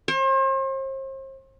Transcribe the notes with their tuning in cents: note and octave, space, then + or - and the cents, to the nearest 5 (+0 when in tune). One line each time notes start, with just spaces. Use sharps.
C5 +40